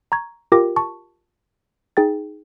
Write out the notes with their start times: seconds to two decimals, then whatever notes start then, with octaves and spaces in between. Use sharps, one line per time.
0.12 A#5 C#6 G#6
0.52 F4 G4 A#4 G5 D6 A#6
0.76 A5 C#6
1.97 D#4 G#4 G5 A6